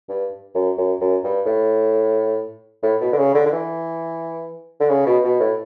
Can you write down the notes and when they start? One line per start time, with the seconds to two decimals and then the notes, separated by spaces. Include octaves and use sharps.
0.09 G2
0.55 F#2
0.78 F#2
1.01 F#2
1.24 G2
1.46 A2
2.83 A2
3.01 B2
3.13 D3
3.18 C#3
3.35 D3
3.46 D3
3.52 E3
4.80 D3
4.89 C#3
5.06 B2
5.24 B2
5.40 A2